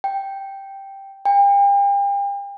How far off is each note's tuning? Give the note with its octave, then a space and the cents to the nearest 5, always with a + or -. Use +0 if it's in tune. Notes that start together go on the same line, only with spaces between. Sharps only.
G5 +0
G5 +40